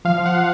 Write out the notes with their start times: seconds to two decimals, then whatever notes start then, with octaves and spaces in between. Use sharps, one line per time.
0.05 F3 F5
0.25 F3 F#5